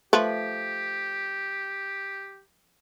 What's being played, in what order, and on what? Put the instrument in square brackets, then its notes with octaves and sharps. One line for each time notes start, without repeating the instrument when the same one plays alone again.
[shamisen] F3 A3 B4 [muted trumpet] G4